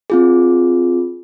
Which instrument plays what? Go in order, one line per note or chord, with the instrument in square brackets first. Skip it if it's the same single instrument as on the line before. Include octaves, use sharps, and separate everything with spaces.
[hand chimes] C4 F4 G#4